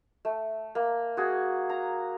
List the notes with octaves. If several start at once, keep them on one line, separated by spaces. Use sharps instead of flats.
A3
A#3
F#4 G#4
A#5